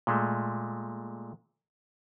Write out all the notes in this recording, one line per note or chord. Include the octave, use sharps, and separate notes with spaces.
A#2 G#3 A3